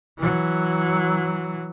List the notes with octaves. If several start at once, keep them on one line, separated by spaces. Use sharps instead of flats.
E3 F#3